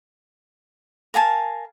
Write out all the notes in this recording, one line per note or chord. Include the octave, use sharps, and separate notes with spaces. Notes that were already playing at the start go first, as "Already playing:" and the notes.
A#4 F5 G#5 A5